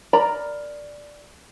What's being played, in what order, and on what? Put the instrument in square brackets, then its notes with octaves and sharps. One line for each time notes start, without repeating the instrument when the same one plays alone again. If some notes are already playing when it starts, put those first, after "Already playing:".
[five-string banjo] A#4 D5 A#5 B5